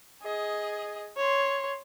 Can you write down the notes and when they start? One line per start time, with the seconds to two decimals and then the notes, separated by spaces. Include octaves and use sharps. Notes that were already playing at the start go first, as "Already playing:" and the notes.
0.23 G#4 D#5
1.17 C#5 C6